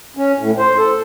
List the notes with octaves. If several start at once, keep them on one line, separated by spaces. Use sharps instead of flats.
C#4
A2
C5
A4